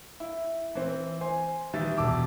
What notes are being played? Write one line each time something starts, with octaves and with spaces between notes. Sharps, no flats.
E4
E3 C4
C5 G#5 C6
D#3 E3 G3 E5 A6
E1 A5 D6 E6